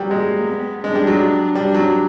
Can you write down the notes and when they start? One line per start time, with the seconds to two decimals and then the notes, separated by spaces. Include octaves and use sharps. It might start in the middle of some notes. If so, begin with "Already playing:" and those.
Already playing: F#3 G3
0.11 G#3 A#3
0.47 B3
0.84 G#3 D4
0.95 G3
1.07 F#3
1.55 G3 D4
1.74 F#3